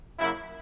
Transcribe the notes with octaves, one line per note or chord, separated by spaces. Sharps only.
F#2 C#3 F#3 A#3 E4